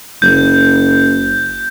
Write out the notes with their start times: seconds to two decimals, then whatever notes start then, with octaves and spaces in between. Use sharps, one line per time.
0.22 F#1 G6